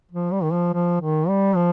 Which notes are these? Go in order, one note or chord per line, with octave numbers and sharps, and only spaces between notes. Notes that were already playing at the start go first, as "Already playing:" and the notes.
F3
G3
D#3
F3
F3
D#3
G3
F3